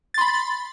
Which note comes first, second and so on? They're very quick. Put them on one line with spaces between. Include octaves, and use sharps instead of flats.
A6 C6 B5